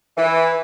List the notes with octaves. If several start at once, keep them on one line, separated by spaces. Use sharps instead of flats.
E3